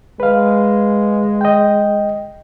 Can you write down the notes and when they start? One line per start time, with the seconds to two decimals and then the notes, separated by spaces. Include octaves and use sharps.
0.20 G#3 B4 F5
1.41 D#5 G5